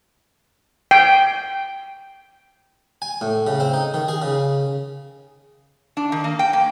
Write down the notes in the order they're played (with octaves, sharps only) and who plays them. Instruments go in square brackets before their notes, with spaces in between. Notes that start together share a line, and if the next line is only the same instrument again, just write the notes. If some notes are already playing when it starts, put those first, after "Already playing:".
[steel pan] G5
[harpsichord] G#5
A2
C#3
C4
D#4
D#3
G#4
C#3
[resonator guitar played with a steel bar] D4
D#3
A#3
G5
A#3